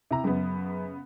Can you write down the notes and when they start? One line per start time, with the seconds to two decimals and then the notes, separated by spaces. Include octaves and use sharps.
0.11 C3 E4 A#5
0.24 F#2 C#3 B3